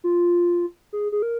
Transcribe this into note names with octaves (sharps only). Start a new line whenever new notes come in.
F4
G#4
G#4
A#4